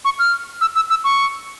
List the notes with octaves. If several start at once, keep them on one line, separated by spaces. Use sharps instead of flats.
C#6
F6
E6
E6
E6
C#6